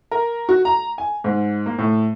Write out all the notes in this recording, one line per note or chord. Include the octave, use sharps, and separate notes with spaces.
A#4
F#4
A#5
G#5
G#2
A#3
A2